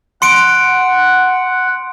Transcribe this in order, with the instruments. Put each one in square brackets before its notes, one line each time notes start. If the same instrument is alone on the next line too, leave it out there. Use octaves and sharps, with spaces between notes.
[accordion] F#5 [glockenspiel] C6 C#7 D7